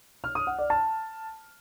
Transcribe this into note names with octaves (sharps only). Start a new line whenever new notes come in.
F6
D#6
F#5
D5
A5